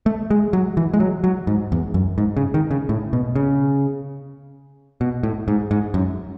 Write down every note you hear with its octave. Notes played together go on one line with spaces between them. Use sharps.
A3
G#3
F#3
E3
G#3
F#3
F#3
G#2
E2
F#2
G#2
C#3
D#3
C#3
A2
B2
C#3
B2
A2
G#2
G#2
F#2